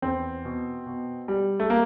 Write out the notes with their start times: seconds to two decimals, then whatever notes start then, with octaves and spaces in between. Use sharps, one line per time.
0.02 E2 C4
0.45 B2
0.86 B2
1.28 G3
1.60 A3
1.70 A#3